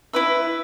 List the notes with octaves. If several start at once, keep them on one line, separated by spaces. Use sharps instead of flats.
E4 B4 E5